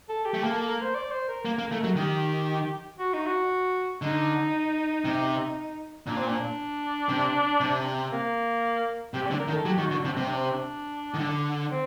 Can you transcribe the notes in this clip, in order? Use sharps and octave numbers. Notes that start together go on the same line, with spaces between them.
A4
G4
A3
A#3 A4
A4
A#4
C5
D5
C5
A#4
A#3
A#3
A3
F#3
D#3 G4
F#4
D#4
F#4
D3 D#4
C3
A#2 D4
C4
D4
C3
C3
A#3
C3 G4
D3 D5
A#4
D#3
A4
F#3 G4
D#3 F#4
D3 F#4
C3 D4
C3 C4
D4
C4
D4
D#3
D3
C4